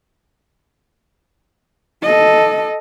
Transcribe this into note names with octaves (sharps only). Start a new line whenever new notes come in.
A4 D#5